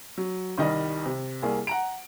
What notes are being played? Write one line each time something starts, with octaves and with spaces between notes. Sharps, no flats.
F#3
C2 D#3 G3 D#5
C3
C2 A#3 G#4
F#5 A#5 D7